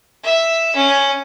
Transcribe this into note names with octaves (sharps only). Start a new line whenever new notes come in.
E5
C#4